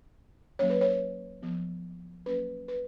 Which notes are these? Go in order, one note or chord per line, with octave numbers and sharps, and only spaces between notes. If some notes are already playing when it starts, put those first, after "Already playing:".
F#3 A#3 C#4 C#5
B4
C#5
F3 B3
F#3 A#3 C#4 B4
B4